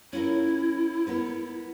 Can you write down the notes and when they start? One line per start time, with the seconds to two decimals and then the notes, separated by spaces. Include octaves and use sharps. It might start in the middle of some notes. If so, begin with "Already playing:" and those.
0.13 C#4 E4 F4 A#4
1.07 B3 A#4 B4